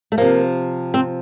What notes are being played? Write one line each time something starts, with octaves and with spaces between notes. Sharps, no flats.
A3
C3 F3 A#3
C4